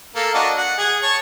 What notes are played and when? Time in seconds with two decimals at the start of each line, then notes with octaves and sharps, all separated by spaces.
0.15 A#3 A4
0.34 D4 F#4 D#5
0.57 F#5
0.78 G#4 G#5
1.02 C#5 A5 C#6